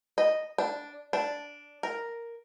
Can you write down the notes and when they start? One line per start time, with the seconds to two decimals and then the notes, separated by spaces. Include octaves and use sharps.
0.18 D#5
0.58 D4
1.13 D4
1.83 A#4